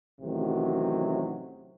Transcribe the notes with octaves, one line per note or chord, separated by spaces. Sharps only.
A1 C3 D#3 F#3